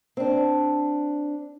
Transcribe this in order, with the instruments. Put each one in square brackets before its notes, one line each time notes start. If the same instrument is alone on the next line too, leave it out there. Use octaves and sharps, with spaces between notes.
[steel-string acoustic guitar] C4 D4